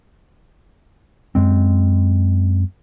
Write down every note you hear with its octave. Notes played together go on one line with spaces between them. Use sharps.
F#2 G#3 C4